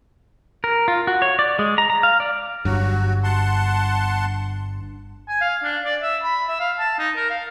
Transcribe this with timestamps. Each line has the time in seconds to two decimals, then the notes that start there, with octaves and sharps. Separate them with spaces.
0.64 A#4
0.88 F4
1.07 F#4
1.22 C#5
1.39 D5
1.59 G#3
1.78 A#5
1.90 A#5
2.03 F5
2.20 D5
2.65 G1 G2 F#3 F#4
3.24 F#5 A5 C6
5.29 G#5
5.41 F5
5.63 D4
5.85 D5
6.02 E5
6.23 B5
6.48 E5
6.60 F5
6.79 A5
6.99 D#4
7.16 A#4
7.30 F5